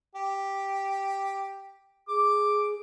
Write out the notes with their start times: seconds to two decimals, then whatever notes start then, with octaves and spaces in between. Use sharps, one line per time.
0.15 G4
2.08 G#4 D6